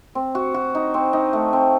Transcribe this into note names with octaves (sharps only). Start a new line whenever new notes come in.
C4
F#4
F#4
D#4
C4
D#4
A3
C4